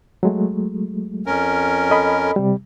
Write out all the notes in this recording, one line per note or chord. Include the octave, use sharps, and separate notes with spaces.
F#3 G#3 A3
F2 C#4 A#4
A4 D#5 B5
C3 G3